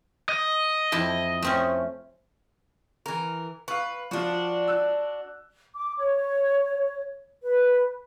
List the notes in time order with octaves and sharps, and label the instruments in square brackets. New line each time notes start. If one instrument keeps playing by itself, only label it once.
[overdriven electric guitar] D#5
[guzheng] F2 E4 A5
A3 C4 C#4
[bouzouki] E3 A#4
[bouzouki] B4 [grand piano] F5 C#6
[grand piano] F3 F4 [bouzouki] D4 F#4
[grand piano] E6 F#6
[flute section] D6
C#5
B4